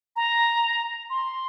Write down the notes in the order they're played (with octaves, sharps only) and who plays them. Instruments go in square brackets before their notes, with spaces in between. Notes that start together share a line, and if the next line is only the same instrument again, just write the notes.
[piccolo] A#5
C6